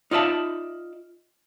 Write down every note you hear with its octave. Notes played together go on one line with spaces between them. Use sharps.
D#4 F4 D5 E5 A5